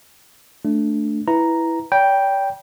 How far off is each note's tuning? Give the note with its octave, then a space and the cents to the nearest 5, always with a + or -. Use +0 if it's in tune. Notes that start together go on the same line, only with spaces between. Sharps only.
A3 +0 D4 +0
E4 +0 B4 +0 A#5 +0
D5 -45 G5 +0 B5 -35